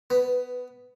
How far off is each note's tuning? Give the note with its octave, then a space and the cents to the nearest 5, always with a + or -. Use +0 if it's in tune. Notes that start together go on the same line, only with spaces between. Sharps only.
B3 +20 B4 +0